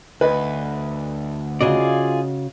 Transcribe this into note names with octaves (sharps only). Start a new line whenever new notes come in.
D2 B4 D#5
C#3 F4 F#4 G#4 D5 D#5